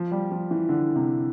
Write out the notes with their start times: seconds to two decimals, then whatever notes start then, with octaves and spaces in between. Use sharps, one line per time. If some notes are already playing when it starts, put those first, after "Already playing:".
Already playing: F3
0.11 G3
0.31 F3
0.51 E3
0.69 D3
0.96 C3